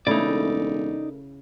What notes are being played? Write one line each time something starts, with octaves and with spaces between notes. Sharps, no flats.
E1 C#3 A3 D#4 E4 A#4 D5